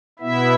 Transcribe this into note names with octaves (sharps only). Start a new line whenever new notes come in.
B2 B3 E4 E5